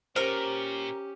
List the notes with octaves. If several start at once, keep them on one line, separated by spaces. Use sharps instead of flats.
A#2 C#4 G4 A#4 C5